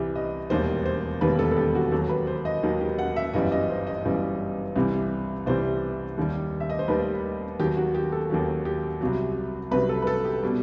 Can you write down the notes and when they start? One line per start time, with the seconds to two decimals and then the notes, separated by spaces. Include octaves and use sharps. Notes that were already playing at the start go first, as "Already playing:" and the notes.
Already playing: C2 C3 E3 G3
0.16 D#5
0.50 E1 D#2 D#3 G3 C5
0.86 C5
1.21 E1 D#2 D#3 G3 B4
1.39 A4
1.51 A4
1.57 G4
1.75 F#4
1.92 D#2 D#3 F#3 A4
2.09 B4
2.27 C5
2.45 D#5
2.63 D#2 D#3 F#3
2.80 G4
2.99 F#5
3.16 E5
3.33 G1 F#2 E3 G3 D#5
3.52 D#5
3.69 C5
3.87 D#5
4.05 G1 F#2 E3 G3
4.76 C2 C3 E3 G3
5.46 C2 C3 E3 G3 C5
6.18 D#2 D#3 G3
6.60 E5
6.70 D#5
6.79 C5
6.88 D#2 D#3 G3 B4
7.60 D#2 D#3 F#3 G4
7.77 F#4
7.95 G4
8.12 A4
8.30 D#2 D#3 F#3 G4
8.65 G4
9.01 C2 C3 F#3
9.71 C2 C3 F#3 B4
9.89 A4
10.02 B4
10.07 A4
10.25 G4
10.43 B2 G3